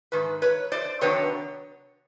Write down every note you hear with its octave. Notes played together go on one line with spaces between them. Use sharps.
G#2 D#3 B4
B4 C#5
C5 D5
C3 D#3 F#3 B3 D4 B4 C#5